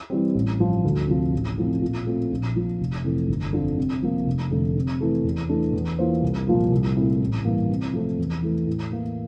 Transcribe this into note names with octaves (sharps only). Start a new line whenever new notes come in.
E3 G3 C4
A1
G2 F3
D2
C3 F3
A1
A2 F3 C4
A#2
A3 C4 F4
A#1
A#2 F3
F1
F2 C3 E3 A3
G1
F2 D3 F3
C3
F3 A#3
F1
F2 D3 A3
C3
E3 A3
E2
E3 A3 D4
E2
E3 A#3 F4 C5
C2
A#2 F3 A#3 F4
C2
A#2 A3 C4 E4
A1
G2 E3 A#3
C3
F3 A3 C4
E2
E3 A3
A2
E3 A#3 E4